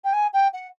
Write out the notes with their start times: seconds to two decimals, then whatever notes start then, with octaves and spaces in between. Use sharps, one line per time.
0.04 G5
0.13 G#5
0.33 G5
0.53 F#5